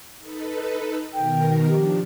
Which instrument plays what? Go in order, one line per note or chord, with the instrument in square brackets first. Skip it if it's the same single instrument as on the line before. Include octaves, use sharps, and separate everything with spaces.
[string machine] D#4 A4 B4
[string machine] B2 D#3 A#4 [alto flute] G5
[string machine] F3 D4 [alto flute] G4